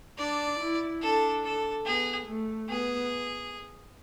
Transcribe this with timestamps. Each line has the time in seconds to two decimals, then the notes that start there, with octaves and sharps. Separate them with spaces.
0.18 D4 D5
0.60 E4
1.02 D4 A4
1.43 A4
1.85 B3 G#4
2.27 A3
2.69 B3 G#4